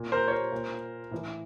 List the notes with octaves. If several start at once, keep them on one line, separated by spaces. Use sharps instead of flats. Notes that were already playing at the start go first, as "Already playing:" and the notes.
Already playing: A#2
A#4 C5
C#5
A#4 C5
A#2
A2 E3